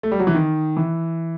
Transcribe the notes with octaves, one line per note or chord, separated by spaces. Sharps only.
A3
G3
F#3
E3
D#3
E3